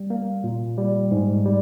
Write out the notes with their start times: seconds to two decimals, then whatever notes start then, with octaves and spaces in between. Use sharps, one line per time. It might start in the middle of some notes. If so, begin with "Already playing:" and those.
Already playing: G3
0.10 A#3
0.44 A#2
0.78 G3
1.11 G#2
1.46 G3